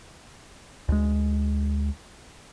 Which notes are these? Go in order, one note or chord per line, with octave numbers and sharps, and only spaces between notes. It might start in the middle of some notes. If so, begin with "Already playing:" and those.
D2 G#3